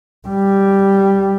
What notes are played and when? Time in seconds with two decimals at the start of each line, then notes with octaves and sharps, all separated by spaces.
0.28 G3